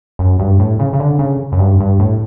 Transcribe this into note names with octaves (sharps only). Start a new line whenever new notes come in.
F#2
G2
A2
C#3
C#3
D3
C#3
F#2
G2
G2
A2